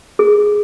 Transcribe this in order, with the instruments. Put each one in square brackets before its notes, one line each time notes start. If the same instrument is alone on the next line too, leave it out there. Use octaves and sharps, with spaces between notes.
[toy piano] G#4